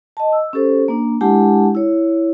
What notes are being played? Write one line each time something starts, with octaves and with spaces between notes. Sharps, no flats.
D#5 A5
E6
C#4 G4 A4 C5
A#3 D4
G#3 D4 E4 G4 F#5 A5
E4 C#5